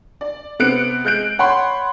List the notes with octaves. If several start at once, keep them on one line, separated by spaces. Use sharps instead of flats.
D5
C3 B3 C4 F#6 C#7 D7
G#3 F#6 G6 D7
C#5 F#5 B5 C6